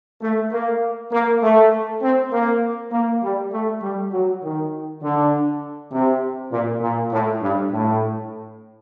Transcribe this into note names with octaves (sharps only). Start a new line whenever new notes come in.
A3
A#3
A#3
A3
C4
A#3
A#3
G3
A3
G3
F#3
D#3
D3
C3
A#2
A#2
A2
G2
A2